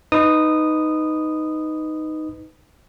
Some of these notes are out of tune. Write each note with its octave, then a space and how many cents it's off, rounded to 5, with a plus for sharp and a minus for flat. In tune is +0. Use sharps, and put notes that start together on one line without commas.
D#4 +0 B4 +15 D#6 -10